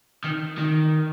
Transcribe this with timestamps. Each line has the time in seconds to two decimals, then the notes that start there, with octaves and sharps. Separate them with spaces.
0.24 D#3
0.58 D#3